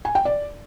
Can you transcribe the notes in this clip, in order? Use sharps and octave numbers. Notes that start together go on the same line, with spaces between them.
G#5
G5
D5